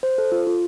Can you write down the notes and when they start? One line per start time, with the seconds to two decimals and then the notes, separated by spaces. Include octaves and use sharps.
0.03 C5
0.18 A4
0.32 F4
0.47 F4